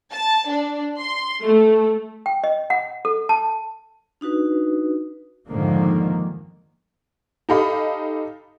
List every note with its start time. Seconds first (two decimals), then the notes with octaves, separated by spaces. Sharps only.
0.12 A5
0.49 D4
0.99 C6
1.45 A3
2.26 G5
2.44 D#5
2.70 F#5
3.05 A4
3.29 A5
4.21 D4 D#4 F#4 B4
5.49 F2 G#2 D3 D#3 F3 A#3
7.49 D#4 G4 A4 D#5 F5 B5